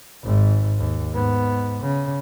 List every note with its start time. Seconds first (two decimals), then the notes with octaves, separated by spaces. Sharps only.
0.23 G#1 G#2
0.78 D#2
1.14 G#2 B3
1.82 C#3